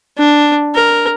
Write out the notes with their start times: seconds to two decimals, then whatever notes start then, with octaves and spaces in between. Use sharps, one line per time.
0.18 D4
0.75 A#4